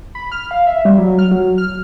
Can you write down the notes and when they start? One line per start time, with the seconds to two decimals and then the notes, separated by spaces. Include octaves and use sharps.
0.15 B5
0.32 F6
0.51 F5
0.67 E5
0.85 G3
0.98 F#3
1.19 F6
1.31 F#3
1.58 F6